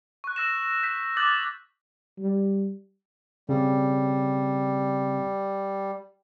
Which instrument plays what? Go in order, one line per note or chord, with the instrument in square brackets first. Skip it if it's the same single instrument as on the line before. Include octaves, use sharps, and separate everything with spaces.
[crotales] C#6 F#6
E6 A#6 E7
G6 B6 E7
D6 D#6 F#6 G6 A6 F#7
[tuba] G3
[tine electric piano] C#3 C4 [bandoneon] G3